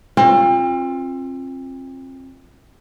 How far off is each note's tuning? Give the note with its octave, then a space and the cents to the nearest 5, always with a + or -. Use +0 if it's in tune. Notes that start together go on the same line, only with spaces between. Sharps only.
C4 +35 F4 +0